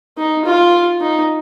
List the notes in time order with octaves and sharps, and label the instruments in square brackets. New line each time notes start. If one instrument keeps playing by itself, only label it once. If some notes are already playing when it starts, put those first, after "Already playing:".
[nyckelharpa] D#4
F4
D#4